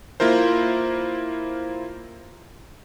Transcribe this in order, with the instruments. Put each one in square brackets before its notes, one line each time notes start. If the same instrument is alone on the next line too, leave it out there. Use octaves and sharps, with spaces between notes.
[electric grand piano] A#3 E4 F4 A#4 C5